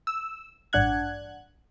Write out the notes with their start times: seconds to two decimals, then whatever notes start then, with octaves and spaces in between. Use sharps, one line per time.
0.07 E6
0.73 A1 G2 D4 F#5 F#6 G#6